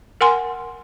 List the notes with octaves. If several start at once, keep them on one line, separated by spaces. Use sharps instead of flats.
A#4 F#5 G#5 C6